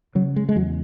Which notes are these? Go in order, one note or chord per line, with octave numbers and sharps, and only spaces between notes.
C#3 F#3
G#3
G#3
E2 F#3